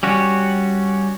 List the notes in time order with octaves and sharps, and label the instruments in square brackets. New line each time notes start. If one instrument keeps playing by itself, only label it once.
[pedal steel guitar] G3 C#4 F#4